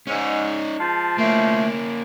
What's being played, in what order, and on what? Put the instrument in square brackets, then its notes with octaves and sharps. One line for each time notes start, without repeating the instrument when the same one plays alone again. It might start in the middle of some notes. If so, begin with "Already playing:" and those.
[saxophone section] G#2 [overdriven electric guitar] C#4 D#4
[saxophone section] F3 G#3 [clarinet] A5
[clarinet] A3 [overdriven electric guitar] A#3 C#4